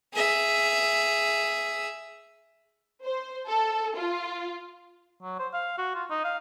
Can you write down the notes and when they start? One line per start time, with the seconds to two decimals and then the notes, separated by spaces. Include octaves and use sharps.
0.14 G#4 E5
3.04 C5
3.48 A4
3.97 F4
5.23 F#3
5.39 C5
5.53 F5
5.78 F#4
5.95 F4
6.10 D#4
6.24 F5